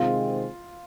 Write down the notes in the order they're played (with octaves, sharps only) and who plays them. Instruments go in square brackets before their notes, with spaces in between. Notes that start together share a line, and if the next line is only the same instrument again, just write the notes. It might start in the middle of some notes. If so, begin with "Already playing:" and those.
Already playing: [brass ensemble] C3 D#3 G#3 C4 [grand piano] F4